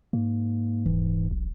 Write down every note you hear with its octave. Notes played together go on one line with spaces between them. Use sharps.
G#2 A#3
D#1 E3
A#1